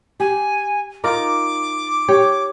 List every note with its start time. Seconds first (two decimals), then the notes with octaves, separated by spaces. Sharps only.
0.20 G4 G#5
1.04 D#4 F4 A#4 D6
2.08 G4 C#5